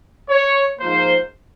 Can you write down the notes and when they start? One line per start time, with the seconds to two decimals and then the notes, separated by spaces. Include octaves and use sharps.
0.30 C#5
0.79 G#2 F3 A#3 C5